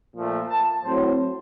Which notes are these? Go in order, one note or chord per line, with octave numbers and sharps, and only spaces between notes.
A#2 F3 A3
A5
A2 F#3 C4 C5